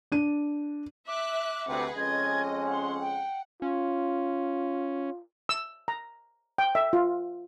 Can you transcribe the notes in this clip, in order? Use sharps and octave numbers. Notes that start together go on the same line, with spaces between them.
D4 D#7
E5 D6 F#6
D2 C3 G#4 B4 F#5
F2 G#3 C#4 D#5 G#6
F#5 C6
G5
C#4 F4
E6
A#5
G5
E5
F4